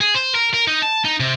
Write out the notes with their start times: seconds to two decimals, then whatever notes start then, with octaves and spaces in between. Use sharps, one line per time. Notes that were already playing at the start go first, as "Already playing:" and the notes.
0.01 G#4
0.15 C5
0.35 A#4
0.53 A#4
0.67 D#4
0.82 A5
1.05 D#4
1.20 C3